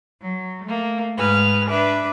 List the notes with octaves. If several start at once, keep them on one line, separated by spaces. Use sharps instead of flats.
F#3
A3 A#3
G#2 G#3 G#4 B4 F6
D4 B4 E5 D6